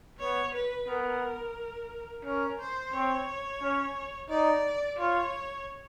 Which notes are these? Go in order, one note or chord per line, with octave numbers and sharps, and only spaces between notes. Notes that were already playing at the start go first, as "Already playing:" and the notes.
B3 C#5
B4
B3 A#4
C#4 A#4
C5
C4 C#5
C#4
D#4 D5
F4 C#5